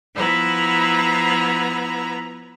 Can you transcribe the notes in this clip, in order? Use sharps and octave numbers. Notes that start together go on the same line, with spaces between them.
F3 B3 E4 B4 A#5